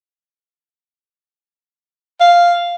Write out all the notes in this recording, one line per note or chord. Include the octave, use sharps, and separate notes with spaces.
F5